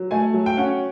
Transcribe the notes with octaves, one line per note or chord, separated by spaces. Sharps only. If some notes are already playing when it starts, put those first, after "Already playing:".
Already playing: F#3
A3 G#5
F#3
G5
C#4 F#5